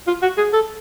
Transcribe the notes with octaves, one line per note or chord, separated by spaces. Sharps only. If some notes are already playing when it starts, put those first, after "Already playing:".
F4
F#4
G#4
A4